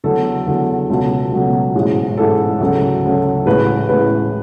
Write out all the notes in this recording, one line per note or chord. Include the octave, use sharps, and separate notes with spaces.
E2 D3 F#3 A3 A4
E2 D3 F#3 A3
C#2 B2 F#3 A3
C#2 B2 F#3 A3
A1 G#2 E3 G#3
A1 G#2 E3 G#3 A4
D2 C#3 F#3 A3
D2 C#3 F#3 A3
A1 A2 G#3 B4
A1 A2 G#3 B4